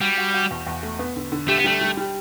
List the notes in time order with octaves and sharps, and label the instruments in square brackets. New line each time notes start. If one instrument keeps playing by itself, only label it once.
[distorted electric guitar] G3 [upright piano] F#4
[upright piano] F#4
F#4
E2
E2
A3
B3
D3
D3
[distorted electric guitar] A3 [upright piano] G4
[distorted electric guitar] B3
[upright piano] G3 [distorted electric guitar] A3
[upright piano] G3
G3